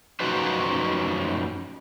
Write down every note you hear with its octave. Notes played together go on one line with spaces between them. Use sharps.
F#2 F3 D#4 F#4 B4 C5